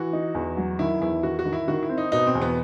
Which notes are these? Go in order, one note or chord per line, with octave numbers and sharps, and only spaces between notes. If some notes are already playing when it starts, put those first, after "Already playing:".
Already playing: E3 F#4
D#4
E2
F#3
D#3 E4
E2 E4
D#3 F#4
F#4
D#3
E4
D#3 F#4
E4
C4
D#4
B2 D#4
C4
E2
B3